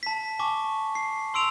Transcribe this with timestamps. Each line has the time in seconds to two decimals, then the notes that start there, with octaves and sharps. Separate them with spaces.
0.03 A5 B6
0.39 G#5 A5 C#6 D6
0.95 C7
1.34 C6 E6 D7 F7